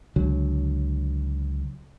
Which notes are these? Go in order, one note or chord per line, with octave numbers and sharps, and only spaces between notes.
C#2 D3 F#3